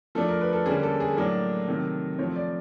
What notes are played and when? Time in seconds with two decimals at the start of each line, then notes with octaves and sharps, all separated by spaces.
0.15 F3 A3 D4 A4
0.28 A#4
0.41 B4
0.53 A4
0.66 D3 G3 A#3 C#4 G#4
0.83 A4
1.00 G#4
1.16 A2 F#3 A#3 D4 A4
1.68 C3 D#3 F#3 A3
2.19 F3 A3 C4 C#5
2.36 D5